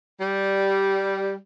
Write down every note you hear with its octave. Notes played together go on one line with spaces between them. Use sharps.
G3